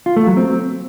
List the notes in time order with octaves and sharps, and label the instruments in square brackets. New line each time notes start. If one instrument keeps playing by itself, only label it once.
[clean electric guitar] F4
A3
F#3
C4